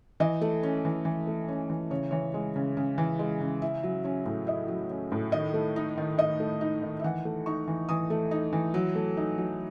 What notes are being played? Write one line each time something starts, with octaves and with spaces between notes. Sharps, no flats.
E3 D#5
A3
C#4
E3
E3
A3
C#4
E3
C#3 C#5
E3 C#5
G#3
C#3
C#3
E3
G#3
C#3
E4
F#3
C#4
A2
E4 D#5
F#3
C#4
A2
D#3 D#5
A3
D#4
D#3
D#3 D#5
A3
D#4
D#3
E5
E3 F#5
A3
D#4 C#6
E3
E3 D#6
A3
D#4
E3
F#3
A3
D#4
F#3